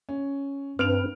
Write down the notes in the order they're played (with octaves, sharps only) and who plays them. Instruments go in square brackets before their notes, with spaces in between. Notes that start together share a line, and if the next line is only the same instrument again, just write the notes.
[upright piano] C#4
[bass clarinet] G2 [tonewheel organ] C4 B4 [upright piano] F6 D7 F7